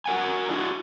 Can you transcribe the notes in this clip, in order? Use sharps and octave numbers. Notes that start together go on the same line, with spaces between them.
F#4 A#4 F#5 G#5
D4 E4 F#4